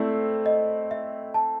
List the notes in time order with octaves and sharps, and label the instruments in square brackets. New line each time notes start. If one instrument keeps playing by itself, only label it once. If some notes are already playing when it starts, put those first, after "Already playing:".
Already playing: [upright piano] A3 C4 E4 A4 [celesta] D5
[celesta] D#5
E5
A5